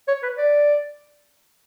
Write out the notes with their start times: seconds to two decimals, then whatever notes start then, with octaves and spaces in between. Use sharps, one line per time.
0.08 C#5
0.23 B4
0.38 D5